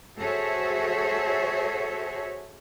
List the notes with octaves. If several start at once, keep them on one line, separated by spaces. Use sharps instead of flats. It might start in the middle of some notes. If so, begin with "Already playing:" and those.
F#4 G#4 A4 C5 C#5 E5